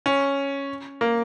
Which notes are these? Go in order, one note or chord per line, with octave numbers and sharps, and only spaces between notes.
C#4
A#3